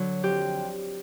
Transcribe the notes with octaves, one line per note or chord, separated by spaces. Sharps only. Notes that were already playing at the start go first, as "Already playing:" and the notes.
Already playing: D3 F#3
F2 G4